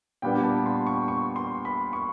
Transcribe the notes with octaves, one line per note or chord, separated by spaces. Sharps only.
A#2 G3 B3 D4 G5
A5
C6
C#6
C#6
C6
B5
C#6